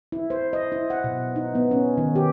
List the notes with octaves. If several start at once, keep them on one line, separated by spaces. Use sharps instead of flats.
E4
C5
D#5
E4
F#5
B2
D#4
B3
C#4
D#3
G4